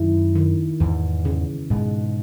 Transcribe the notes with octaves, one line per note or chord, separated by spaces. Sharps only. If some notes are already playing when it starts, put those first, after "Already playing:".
Already playing: F#2 D#3 E4
D#3
E2 G#2 E3
C#3
G#2 B2 G#3